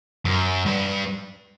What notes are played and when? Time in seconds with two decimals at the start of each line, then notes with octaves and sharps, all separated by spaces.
0.25 F#2
0.66 G2